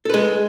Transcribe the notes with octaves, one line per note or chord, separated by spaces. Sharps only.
G#3 A4 B4